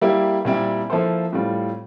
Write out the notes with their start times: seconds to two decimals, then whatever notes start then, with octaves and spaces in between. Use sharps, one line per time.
0.01 G3 A#3 E4 G4
0.45 A#2 G3 C4 E4
0.90 F3 A#3 E4 A4 C5
1.33 A2 G3 C4 F4